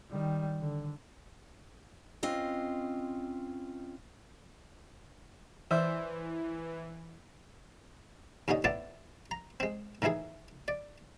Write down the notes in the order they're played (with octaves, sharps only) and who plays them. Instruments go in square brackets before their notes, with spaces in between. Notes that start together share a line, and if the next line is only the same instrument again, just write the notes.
[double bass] D#3 G3
D3
[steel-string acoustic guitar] C4 C#4 F4 D#5
[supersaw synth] E3 [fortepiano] C5 D5 E5
[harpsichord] D#2 A#2 D3 C#4 D#5
A2 B3 E4 D5 A5
A#5
G#3 C4
A2 D#3 E3 E4 G#4
D5